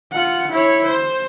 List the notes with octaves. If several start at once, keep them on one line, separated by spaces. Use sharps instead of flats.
F4 F#5
E4 C#5
C5